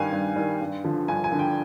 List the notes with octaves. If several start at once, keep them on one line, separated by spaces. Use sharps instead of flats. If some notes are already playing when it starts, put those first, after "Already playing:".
Already playing: G2 D#3 G3 F5 G#5
G2
D#3 G3
G2
D3 F3
G2 G#5
G#5
D3 F3
G5